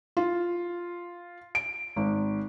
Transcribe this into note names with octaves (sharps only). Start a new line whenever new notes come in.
F4
D7
G#1